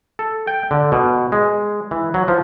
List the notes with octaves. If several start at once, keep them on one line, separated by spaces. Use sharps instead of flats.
A4
G5
D3
B2
G#3
E3
F#3
F3